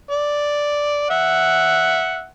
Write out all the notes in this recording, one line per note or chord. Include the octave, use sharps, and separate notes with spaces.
D5
E5 F#5